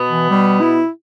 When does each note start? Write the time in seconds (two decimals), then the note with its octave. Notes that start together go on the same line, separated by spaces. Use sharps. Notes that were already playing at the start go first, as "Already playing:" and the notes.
Already playing: B2 B3
0.10 E3
0.30 G3
0.61 E4